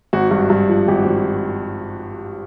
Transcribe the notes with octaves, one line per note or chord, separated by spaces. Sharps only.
G#1 F#4
G2
G2
F3
G#1 G4
G#1